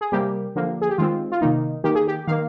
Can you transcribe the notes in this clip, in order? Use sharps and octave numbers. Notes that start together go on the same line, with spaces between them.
G#4
C3 G3 A#3 G4
D3 F3 A#3
G#4
G4
D#3 G#3 C4 F4
F4
C3 D#3 A#3 D#4
D#3 A#3 G4
G#4
G4
D#3 A#3 F5